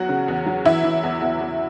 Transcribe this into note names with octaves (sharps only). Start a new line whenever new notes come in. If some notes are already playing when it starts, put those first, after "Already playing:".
Already playing: E2 F#3 F#4 F#5
C#3
E2
F#3
E3 E4 E5
E3
E2
E2
E2